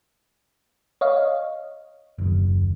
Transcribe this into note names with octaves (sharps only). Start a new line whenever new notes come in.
C#5 D#5 F5
F#1 D#2